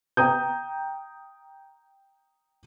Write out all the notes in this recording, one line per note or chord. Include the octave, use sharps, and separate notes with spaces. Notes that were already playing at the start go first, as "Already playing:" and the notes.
G5 A#5 D#6 G6